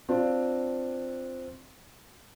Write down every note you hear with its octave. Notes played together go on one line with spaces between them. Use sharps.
C4 D4 F4